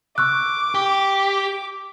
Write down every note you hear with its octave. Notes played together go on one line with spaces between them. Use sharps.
C#6 D6 E6 F#6
G4